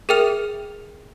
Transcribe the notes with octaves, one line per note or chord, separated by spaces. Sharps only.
G#4 A#4 E5 G5 F6 F7